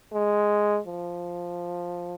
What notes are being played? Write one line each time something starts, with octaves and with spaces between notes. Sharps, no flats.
G#3
F3